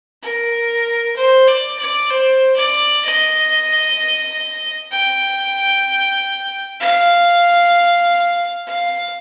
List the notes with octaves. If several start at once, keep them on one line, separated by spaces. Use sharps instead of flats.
A#4
C5
D5
D5
C5
D5
D#5
G5
F5
F5